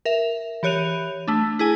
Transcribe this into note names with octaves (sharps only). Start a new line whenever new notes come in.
A#4 E5
E3 G4 C#5 F#6 D#7 F7
A3 D4
E4 G#4 G#5